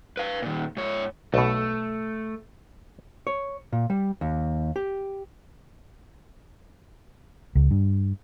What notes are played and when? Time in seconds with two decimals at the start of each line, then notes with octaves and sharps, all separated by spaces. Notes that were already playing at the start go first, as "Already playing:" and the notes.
0.17 B4 F5
0.42 A#2 D#3
0.77 G#2 C#5
1.34 B1 B2 A3
3.27 C#5
3.72 A#2
3.90 G3
4.21 D#2
4.76 G4
7.55 C#2
7.71 G2